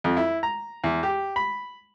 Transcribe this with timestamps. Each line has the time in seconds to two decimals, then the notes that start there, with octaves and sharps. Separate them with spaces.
0.04 F2
0.17 E4
0.43 A#5
0.84 E2
1.03 G4
1.36 B5